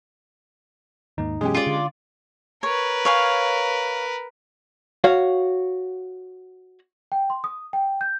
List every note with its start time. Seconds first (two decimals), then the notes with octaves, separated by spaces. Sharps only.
1.18 D#2 G#2 A#3 D#4
1.41 F#2 B2 E3 G#3 C#4 G4 G#4
1.55 F4 D5
1.67 D3
2.63 A#4 B4 C#5
3.05 C#5 F5 G#5
5.04 F#4 C#5 F5
7.12 G5
7.30 C6
7.44 D#6
7.73 G5
8.01 G6